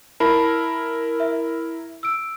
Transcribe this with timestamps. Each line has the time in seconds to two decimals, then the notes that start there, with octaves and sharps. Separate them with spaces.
0.20 E4 A#4 A5 B5 C7
1.20 E5
2.03 E6 D7